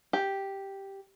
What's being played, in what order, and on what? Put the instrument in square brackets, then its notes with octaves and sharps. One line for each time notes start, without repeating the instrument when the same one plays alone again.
[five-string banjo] G4